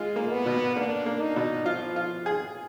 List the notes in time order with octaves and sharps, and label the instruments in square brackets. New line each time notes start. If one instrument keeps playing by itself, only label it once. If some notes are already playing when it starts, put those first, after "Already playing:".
Already playing: [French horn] G#3 [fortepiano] F4
[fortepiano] A#3
[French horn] B3
[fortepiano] B2
[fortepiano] A#3 [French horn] D4
[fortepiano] A#3
[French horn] D#4
[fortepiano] B2
[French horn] F3 [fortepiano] F4
[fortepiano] F4
G#4